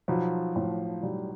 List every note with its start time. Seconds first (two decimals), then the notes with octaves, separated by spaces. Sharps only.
0.08 B1 F3
0.56 A2 F3
1.02 B1 G3